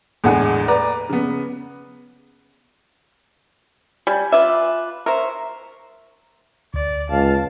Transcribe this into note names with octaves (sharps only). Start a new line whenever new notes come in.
E2 A2 D3 G#3 F#5 G#5
B4 D5 A#5 D6
C#3 B3
G3 G#5
F4 B4 D5 E5
A#4 C5 C#5 E5
D2 D5
C#2 F5 A5